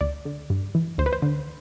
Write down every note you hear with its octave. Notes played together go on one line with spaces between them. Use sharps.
D2 D5
D3
G2
E3
D2 C5
B4
C5
D3